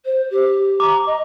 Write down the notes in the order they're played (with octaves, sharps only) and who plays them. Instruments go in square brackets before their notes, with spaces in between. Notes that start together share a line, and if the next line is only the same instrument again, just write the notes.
[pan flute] C5
G4
[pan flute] A#5 [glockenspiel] D6
[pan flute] D#5